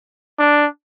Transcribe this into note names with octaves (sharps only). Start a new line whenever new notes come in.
D4